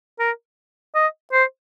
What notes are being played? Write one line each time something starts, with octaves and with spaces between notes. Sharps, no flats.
A#4
D#5
C5